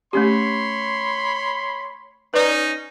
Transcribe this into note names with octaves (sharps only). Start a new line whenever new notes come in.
A3 C#4 G4 C#5 B5 C6
C#4 D#4 B4 D5